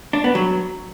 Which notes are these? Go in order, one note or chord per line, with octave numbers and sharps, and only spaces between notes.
D4
B3
F#3